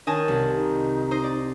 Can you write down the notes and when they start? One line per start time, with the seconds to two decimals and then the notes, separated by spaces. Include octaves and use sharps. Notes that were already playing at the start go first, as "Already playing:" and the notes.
0.07 D#3 C#5 D#5 G#5 A5
0.28 C2
0.57 D#4
1.11 C5 D#5
1.24 D5